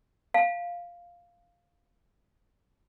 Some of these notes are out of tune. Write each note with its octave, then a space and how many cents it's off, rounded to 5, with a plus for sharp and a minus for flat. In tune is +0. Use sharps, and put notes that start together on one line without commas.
F5 +0 A5 +0